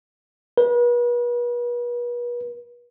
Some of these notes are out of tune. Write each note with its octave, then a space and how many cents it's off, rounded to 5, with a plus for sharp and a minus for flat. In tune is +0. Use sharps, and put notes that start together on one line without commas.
B4 -40